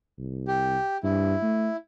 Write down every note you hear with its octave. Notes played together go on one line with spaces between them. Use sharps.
C2
G4
G2 E4
A3